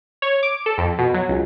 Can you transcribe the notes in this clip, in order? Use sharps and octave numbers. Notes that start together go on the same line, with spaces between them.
C#5
D6
A4
F2
B2
F#3
C#2